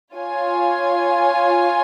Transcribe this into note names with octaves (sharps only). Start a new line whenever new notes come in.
F4 C#5 G#5